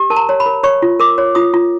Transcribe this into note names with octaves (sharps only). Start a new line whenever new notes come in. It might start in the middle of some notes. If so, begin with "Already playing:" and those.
Already playing: G4
A#4 A5
A#5
C#5
B5
A#4
C#5 C#6
F4
A#4 D6
C#5
F4 D#6
F4